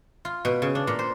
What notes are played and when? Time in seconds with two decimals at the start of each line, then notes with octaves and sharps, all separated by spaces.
0.25 F4
0.45 B2
0.62 C#3
0.75 D4
0.87 A#2
0.99 C5